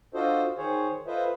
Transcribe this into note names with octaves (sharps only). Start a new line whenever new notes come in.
D4 F4 F#4 A4 C5 D#5
D#3 G#4 C5 C#5
F4 A4 B4 C5 D#5 E5